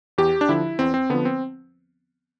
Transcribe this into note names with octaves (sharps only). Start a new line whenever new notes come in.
E2 G4
D4
D3 F3 E4
E2 C4
C4
D3 F3 B3
C4